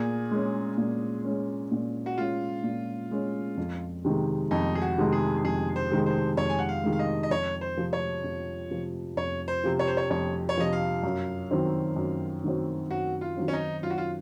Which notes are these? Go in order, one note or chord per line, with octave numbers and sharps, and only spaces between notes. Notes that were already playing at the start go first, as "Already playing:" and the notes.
Already playing: A#2 G#4
G#3 C#4
A#2
G#3 C#4
A#2
F#4
G#3 C#4 F4
A#2
G#3 C#4
F2
C3 D#3 G#3
F2 D#4
G#4
F#4
C3 D#3 G#3
G#4
F2 G#4
C5
C3 D#3 G#3
C5
F2 C#5
G#5
F#5
F5
C3 D#3 G#3
F5
D#5
D#5
F2 C#5
C5
C3 F3
C#5
F2
C3 F3
F2 C#5
C5
C3 F3
C#5
C5
C#5
F2 C#5
C#5
C3 F3 D#5
F5
F#2
D#3 F#3 C4
F#2
D#3 F#3 C4
F#2 F#4
F4
D#3 F#3 C4
C#4
D#4
F#2 F4
F#4
F4